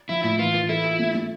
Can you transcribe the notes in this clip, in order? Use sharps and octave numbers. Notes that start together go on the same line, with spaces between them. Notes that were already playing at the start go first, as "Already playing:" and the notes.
F3 E4
A2 E4
E3 F4
E3
E4 A4
F4
A3
A3